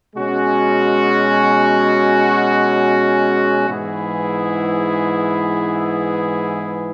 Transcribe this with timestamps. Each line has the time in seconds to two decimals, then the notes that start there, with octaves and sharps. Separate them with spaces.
0.14 B2 G#3 C#4 F#4
3.68 G#2 E3 B3 E4 G#4